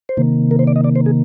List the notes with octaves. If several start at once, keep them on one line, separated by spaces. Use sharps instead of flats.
C5
C3 D#3 A#3
A#4
C5
D5
D#5
D5
C5
G#4